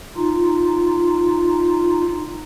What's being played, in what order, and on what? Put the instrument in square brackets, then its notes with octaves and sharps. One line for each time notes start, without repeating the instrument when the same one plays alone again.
[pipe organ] D#4 F4